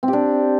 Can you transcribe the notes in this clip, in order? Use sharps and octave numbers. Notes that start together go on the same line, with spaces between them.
C4
G4
D4